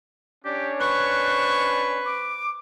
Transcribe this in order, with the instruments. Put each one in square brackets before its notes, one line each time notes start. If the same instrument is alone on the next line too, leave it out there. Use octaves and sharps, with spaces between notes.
[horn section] C#4 D4 C#5 [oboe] G4
[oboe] B4 [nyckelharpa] C5 C#6 [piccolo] F#6
[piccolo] D6